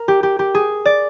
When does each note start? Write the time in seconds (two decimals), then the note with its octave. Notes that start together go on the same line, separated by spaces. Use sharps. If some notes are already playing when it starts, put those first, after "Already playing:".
Already playing: A#4
0.08 G4
0.23 G4
0.39 G4
0.55 G#4
0.86 D5